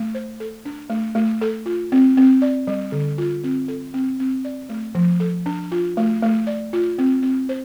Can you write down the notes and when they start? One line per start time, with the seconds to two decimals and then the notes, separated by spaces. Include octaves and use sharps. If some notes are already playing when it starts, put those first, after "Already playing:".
Already playing: A3
0.15 C5
0.40 A4
0.65 D4
0.90 A3
1.15 A3
1.41 A4
1.66 F4
1.92 C4
2.17 C4
2.42 D5
2.67 G3
2.92 D3
3.18 F4
3.44 C4
3.68 A4
3.94 C4
4.20 C4
4.45 D5
4.69 A3
4.95 F3
5.20 A4
5.46 D4
5.72 F4
5.97 A3
6.23 A3
6.47 D5
6.73 F4
6.98 C4
7.23 C4
7.49 C5